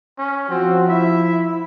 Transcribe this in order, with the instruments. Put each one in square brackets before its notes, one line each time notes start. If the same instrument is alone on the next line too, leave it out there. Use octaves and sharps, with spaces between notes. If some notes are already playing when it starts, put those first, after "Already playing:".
[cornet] C#4
[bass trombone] F3 [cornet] C4 [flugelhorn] F#4
[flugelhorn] E4 [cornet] E5